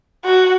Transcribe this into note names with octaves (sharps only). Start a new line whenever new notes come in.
F#4